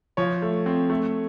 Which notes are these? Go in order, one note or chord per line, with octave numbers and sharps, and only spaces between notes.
F3 C#5
A3
C4
A3